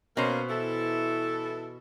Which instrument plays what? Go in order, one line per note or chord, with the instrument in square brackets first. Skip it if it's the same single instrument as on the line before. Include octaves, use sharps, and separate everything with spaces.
[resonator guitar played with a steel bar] B2 C5 [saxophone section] A#3 C#4
[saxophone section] E3 E4 A4